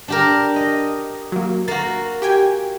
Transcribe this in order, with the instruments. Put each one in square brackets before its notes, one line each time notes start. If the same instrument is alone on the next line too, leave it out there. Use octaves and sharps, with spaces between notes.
[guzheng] D4 G4 A#4
D#5
[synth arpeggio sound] F#3 A#3
[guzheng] A#3 F#4 [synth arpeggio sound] A6
[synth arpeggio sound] G4 G5 G#5